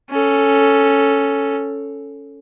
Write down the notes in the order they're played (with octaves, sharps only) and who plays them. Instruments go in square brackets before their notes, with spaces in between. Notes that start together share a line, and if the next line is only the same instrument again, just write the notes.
[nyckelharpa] C#4 A4